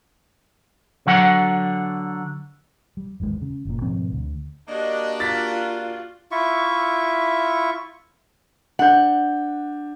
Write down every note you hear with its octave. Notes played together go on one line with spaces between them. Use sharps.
D3 F#3 F#5
G3
G#1 E2 D3 G#3
C#3
G1 A#2
G#2 B2 F3 C4
D2
A#3 D4 F#4 G4 D#5
F4 A6 B6
E4 F4 E5 C#6
D4 F#5 G6